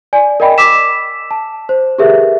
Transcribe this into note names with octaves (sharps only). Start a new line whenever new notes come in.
D5 G#5
A#4 D5 D#5 G5 B5
D6 E6 B6 E7
A5
C5
G4 G#4 A#4 B4 E5